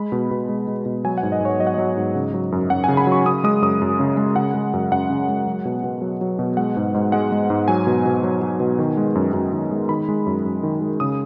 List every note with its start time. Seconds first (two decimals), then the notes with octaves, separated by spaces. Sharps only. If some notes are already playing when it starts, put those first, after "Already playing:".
Already playing: G#3 B5
0.12 B2
0.31 B2
0.49 G#3
0.68 G#3
0.85 B2
1.04 F#3 G#5
1.18 F#5
1.23 G#2
1.32 D#5
1.41 G#2 C#5
1.59 F#3 D#5
1.67 F#5
1.74 F#3 D#5
1.97 G#2
2.15 C#3
2.34 F#3
2.52 F#2
2.70 F#2 F#5
2.84 C#3 G#5
2.97 B5
3.07 F#3
3.12 C#6
3.26 C#3 D#6
3.44 G#3 D#6
3.62 F#2 D#6
3.82 F#2
3.99 C#3
4.17 G#3
4.36 C#3 F#5
4.54 G#3
4.73 F#2
4.92 F#2 F#5
5.10 C#3
5.29 G#3
5.46 F#3
5.65 B2
5.84 B2
6.02 F#3
6.21 F#3
6.39 B2
6.57 G#3 F#5
6.77 G#2
6.94 G#2
7.12 G#3 F#5
7.32 G#3
7.50 G#2
7.68 F#3 G#5
7.87 B2
8.06 B2
8.23 F#3
8.42 F#3
8.60 B2
8.79 D#3
8.97 G#3
9.15 F#2
9.34 F#2
9.52 D#3
9.71 G#3
9.89 D#3 B5
10.09 G#3
10.26 F#2
10.45 F#2
10.63 D#3
10.81 G#3
11.00 C#3 D#6